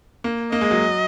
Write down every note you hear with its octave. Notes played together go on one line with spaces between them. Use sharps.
A#3
A#3 D#5
G#3
F#3